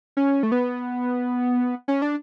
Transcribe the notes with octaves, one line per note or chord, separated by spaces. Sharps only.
C#4
A3
B3
C#4
D4